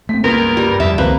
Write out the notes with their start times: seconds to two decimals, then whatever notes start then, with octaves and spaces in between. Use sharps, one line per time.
0.09 A3 C4 B6
0.24 C#2 G2 A#3 B3 A#4
0.57 G3
0.80 F2 G3 E5 A5
0.98 C#2 D#3 F3 A#3 C4 B4